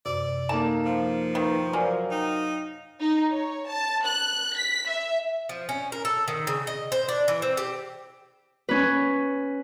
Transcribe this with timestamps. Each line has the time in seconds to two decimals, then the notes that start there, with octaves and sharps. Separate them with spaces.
0.06 F#2 C3 D5
0.49 A#3 D#4 A4 A5
0.85 F3 F5
1.35 D#3 B4 G6
1.73 F#3 A#3 A#4 C5 D5 G#5 F6
2.11 D#4 G5 A#5
3.00 D#4
3.32 C#5
3.69 A5
4.06 F#6
4.59 B6
4.89 E5
5.49 F3
5.69 C#4
5.92 A#4
6.05 A4
6.28 D#3
6.47 C#3
6.67 D#5
6.92 C5
7.09 D4
7.28 E3
7.42 C4
7.57 G4
8.69 C#4 B4